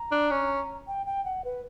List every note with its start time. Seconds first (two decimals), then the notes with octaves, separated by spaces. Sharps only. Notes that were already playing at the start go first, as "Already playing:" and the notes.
Already playing: A#5
0.12 D4
0.31 C#4
0.87 G5
1.06 G5
1.25 F#5
1.44 B4